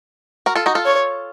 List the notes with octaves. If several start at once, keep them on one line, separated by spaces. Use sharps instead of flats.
F#4 A#4
F4 A4
D#4 F#4
F4 A4
C#5